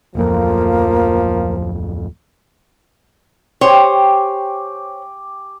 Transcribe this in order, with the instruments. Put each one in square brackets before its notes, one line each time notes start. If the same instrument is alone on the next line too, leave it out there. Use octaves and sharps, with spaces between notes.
[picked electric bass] D1 F2 [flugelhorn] F3 [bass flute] A#3
[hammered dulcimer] G4 G5 G#5 [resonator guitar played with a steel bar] C5 C#5